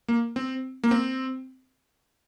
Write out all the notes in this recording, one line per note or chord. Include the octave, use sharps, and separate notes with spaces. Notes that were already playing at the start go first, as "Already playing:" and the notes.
A#3
C4
A#3
C4